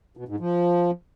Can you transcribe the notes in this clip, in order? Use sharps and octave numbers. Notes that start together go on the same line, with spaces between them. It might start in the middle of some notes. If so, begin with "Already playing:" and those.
B2
G#2
F3